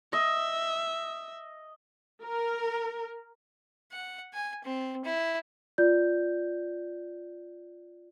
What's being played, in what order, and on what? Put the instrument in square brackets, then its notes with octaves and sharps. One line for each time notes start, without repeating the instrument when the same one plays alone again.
[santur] D#5 [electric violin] E5
[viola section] A#4
[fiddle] F#5
G#5
C4
E4
[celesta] F4 D5 G6